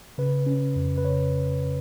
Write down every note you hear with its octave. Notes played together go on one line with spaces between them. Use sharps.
C#3 B4
C#4
F2
B4
C#3 C#5